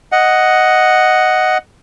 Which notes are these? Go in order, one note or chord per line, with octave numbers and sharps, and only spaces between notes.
D#5 F#5